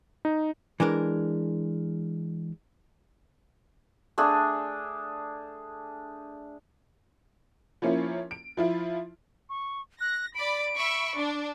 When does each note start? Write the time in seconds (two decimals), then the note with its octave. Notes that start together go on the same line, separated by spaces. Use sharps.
0.25 D#4
0.80 E3 G#3 D4 A#4
4.18 A3 D4 G#4
7.82 F3 A#3 C#4 E4 F4
8.31 D7
8.57 F3 E4 F4
9.50 C#6
10.01 F#6 A#6
10.35 D5 B5 D7
10.76 E5 B5 C#6
11.15 D4